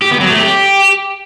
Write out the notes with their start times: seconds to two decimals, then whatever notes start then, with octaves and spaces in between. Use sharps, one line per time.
0.02 G4
0.11 B3
0.21 F#3
0.30 A3
0.39 G4